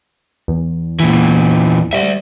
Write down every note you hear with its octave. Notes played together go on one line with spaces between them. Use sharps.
E2
A#2 E3
G3 D5 E5